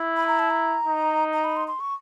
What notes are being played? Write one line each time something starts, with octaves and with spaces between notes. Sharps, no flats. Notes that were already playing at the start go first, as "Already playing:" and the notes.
Already playing: E4
B5
A#5
A5
A#5
D#4
A#5
B5
C6
C6
C#6